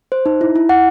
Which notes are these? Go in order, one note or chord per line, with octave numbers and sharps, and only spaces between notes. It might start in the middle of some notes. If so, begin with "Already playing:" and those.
C5
D#4
E4
E4
F#5